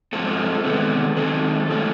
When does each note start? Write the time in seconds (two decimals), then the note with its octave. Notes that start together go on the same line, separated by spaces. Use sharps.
0.13 G#2 F3 G#3 C4 A4
0.64 C3 D#3 G#3 B3
1.16 F#2 D#3 G#3 C4 A4
1.70 C#3 F3 A3 C#4